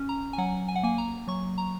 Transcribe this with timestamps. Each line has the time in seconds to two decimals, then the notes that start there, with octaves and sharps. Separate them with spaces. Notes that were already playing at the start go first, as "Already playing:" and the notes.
Already playing: C#4
0.09 A#5
0.33 G#5
0.38 F#3 F#5
0.68 G#5
0.76 F#5
0.83 A#3 G#5
0.98 A#5
1.28 F#3 C#6
1.58 A#5